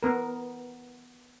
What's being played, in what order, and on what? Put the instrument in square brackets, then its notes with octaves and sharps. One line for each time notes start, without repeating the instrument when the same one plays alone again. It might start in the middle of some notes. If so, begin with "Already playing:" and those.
[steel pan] B3 A#4